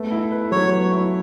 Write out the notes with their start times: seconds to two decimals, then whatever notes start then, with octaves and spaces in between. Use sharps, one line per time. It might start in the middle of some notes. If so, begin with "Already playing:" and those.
Already playing: A3 B3
0.11 E4
0.32 B4
0.52 F#3 C#5
0.71 B3
0.92 E4